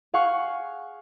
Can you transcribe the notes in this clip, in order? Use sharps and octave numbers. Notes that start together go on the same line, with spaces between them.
G#4 F5 F#5 C#6